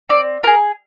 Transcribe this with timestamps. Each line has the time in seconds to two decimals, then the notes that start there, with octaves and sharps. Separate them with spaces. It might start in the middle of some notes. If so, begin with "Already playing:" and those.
0.09 C4 D5
0.43 F4 G#4 A#4